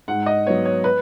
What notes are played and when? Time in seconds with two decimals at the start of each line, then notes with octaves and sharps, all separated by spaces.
0.08 G#2 F#5
0.26 D#5
0.46 F#3 B3 C#5
0.65 C#5
0.84 B4